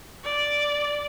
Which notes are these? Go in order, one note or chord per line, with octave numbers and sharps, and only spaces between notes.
D5